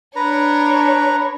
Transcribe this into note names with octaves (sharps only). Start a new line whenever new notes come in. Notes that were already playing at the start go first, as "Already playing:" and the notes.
D4 B4 C#5 A#5